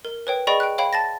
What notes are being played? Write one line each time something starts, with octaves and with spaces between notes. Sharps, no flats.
A#4
B4 C#5 G5
G#4 D5 D#5 G5 B5 C#6
G5 F#6
C#5 F5 G5 B5
A5 A6 A#6